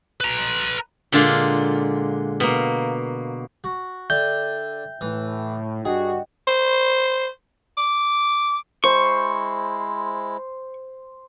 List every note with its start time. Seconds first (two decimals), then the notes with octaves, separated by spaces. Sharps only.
0.21 B4 A#5
1.12 A#2 D3 G#3 F4
2.40 B2 A#3
3.64 F#4
4.10 D3 E5 G5 G6
5.01 A2 E3
5.85 G2 D4 F#4 G#4 D#5 F#5 G5
6.47 C5
7.77 D6
8.84 G#3 E4 C5 C#6